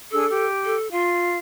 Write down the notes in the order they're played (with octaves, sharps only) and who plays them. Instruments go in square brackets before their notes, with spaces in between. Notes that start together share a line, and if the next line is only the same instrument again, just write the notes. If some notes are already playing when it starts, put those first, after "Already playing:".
[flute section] D4 G#4 E6 [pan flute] A4
[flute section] G4
[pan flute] A4
[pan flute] F4 [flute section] F5